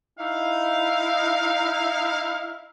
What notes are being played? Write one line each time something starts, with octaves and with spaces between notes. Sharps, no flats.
D#4 E4 F5